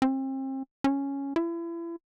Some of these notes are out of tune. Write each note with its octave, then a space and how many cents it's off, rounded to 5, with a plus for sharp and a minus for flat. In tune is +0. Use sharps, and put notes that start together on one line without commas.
C4 +35
C#4 +0
E4 +35